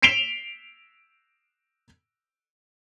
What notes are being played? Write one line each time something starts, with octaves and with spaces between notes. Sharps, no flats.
B6 C7 D7 E7 F7 G7